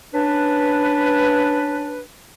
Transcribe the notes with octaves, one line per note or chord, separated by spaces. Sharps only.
C#4 D4 B4